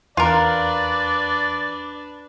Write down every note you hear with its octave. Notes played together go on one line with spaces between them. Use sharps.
E2 D4 F4 A#4 B4 D5